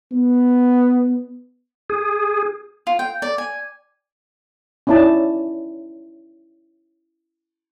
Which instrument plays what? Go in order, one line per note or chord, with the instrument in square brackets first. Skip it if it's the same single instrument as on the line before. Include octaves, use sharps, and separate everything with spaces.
[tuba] B3
[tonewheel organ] G#4
[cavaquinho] F4
G5
D5
G#5
[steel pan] C#4 D#4 E4 D5 A5